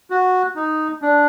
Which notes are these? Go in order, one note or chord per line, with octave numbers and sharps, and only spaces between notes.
F#4
D#4
D4